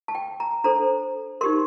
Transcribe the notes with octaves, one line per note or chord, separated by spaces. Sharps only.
A5
G5
A#5
D4 A4 C5 A#5
D#4 G4 A#4 C6